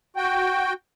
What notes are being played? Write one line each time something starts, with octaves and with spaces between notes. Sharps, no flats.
F#4 G5